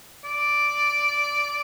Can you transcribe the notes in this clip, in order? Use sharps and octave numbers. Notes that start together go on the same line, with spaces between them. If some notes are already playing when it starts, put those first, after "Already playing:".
D5